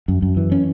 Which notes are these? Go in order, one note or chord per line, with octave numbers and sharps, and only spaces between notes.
F#2
F#2
E3
C#4